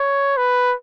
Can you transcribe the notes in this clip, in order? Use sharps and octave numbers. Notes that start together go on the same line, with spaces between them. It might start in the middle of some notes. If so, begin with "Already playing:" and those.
Already playing: C#5
B4